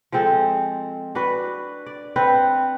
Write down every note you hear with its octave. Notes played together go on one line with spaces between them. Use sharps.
F3 G#3 C4 A4
D4 F#4 B4
D5
C4 B4 F#5